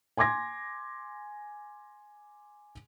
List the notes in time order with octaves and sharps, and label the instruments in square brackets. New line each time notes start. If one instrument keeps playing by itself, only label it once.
[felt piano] G#5 C6 D6 G#6 A#6